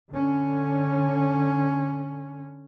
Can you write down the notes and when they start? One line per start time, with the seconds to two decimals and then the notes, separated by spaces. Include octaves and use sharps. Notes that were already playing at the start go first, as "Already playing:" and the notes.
0.11 D3 C#4